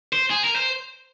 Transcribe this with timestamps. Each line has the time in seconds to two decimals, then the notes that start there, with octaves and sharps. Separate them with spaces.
0.13 C5
0.30 G#4
0.44 A#4
0.56 C5